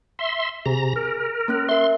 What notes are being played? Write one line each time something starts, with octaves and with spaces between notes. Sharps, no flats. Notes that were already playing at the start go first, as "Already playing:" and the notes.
E5 C6
C3 G#4 A#5
A#4
A#3 C#4 F#6
A#4 E5 C6